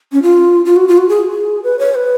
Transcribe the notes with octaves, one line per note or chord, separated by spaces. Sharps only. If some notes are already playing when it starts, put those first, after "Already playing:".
C#4
F4
F4
F#4
F4
F#4
G#4
G#4
B4
C#5
B4